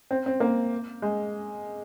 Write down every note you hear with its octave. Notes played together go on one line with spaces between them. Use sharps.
C4
C4
A#3
G#3